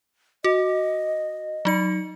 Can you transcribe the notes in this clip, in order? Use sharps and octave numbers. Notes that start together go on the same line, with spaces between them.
F#4 D#5
F#3 D#4 C#7